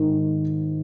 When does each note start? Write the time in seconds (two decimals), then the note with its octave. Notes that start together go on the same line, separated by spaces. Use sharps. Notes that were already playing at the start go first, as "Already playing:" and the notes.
Already playing: G#2 D#3